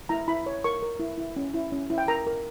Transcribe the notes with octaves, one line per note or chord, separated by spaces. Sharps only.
E4 A#5
E4 B5
C#5
A#4 C#6
A#4
E4
E4
C#4
E4
C#4
E4
G5
A#4 A#5
A#4